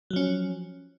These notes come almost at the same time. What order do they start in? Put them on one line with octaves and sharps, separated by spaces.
F#3 F3 C#4